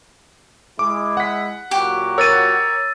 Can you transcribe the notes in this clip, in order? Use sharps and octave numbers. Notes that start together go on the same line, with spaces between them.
G#3 E4 D6
F#5 B6
A#2 F#3 F#4 G4
A#4 C#5 E6 A6 D#7